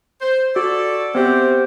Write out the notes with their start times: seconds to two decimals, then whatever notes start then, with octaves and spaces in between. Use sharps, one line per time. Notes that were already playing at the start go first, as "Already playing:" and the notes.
0.21 C5
0.56 F#4 A4 D5
1.15 C3 B3 C4 G4 C5